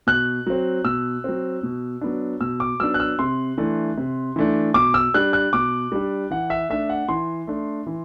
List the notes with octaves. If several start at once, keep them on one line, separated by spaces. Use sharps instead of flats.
B2 F#6
F#3 C4
B2 E6
F#3 C4
B2
F#3 B3 D4
B2 E6
D6
F#3 B3 D4 E6
F#6
E6
C3 C6
E3 A3 D4
C3
E3 A3 D4
B2 D6
E6
G3 D4 F#6
F#6
B2 D6
G3 D4
E3 F#5
E5
A3 D4 E5
F#5
E3 C6
A3 D4
E3